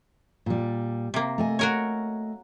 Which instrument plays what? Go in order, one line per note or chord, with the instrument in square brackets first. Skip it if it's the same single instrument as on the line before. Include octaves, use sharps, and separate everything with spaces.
[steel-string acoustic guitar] A#2 G3
[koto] C3 A#3
[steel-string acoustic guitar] A3 D#5 G#5
[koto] F#4 A#4 C#5